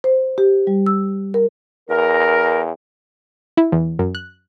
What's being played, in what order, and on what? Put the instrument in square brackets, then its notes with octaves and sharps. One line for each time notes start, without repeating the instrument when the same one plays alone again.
[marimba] C5
G4
G3
E6
A#4
[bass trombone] E2 [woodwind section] A#4
[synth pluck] E4
E2
F#2
F#6